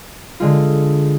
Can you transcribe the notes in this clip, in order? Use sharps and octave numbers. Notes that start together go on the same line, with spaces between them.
D3 G#3 F4